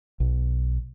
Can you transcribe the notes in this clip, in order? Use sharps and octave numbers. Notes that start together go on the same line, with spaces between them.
B1